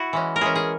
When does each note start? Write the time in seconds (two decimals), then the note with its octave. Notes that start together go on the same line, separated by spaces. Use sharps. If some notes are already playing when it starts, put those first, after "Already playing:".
Already playing: E4 F#4
0.13 E3 G#3 C#4
0.36 A#4
0.41 E3 G#3 C#4 G#4
0.56 G#4